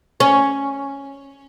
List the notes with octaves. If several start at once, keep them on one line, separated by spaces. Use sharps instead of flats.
C#4